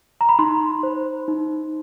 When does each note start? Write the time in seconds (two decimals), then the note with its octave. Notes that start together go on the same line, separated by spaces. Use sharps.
0.21 A#5
0.29 B5
0.39 D#4 C6
0.83 C5
1.28 D#4